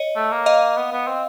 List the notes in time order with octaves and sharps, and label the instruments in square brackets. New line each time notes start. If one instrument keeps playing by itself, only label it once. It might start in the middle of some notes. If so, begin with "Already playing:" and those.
Already playing: [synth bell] C#5 D#5
[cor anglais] A3
A#3
[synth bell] D#5 F5
[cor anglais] B3
B3
C4